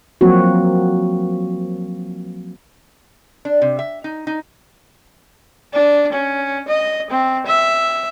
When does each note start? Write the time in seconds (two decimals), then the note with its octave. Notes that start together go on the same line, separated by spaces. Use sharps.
0.21 F3 F#3 A#3 C4 F#4
3.45 D4
3.62 C3
3.79 E5
4.04 D#4
4.27 D#4
5.74 D4
6.13 C#4
6.68 D#5
7.11 C4
7.47 E5